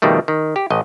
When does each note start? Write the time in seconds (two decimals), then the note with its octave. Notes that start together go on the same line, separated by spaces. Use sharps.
0.02 F2 B2 D#3 G3 A3
0.28 D#3
0.56 G4
0.70 A1 D#5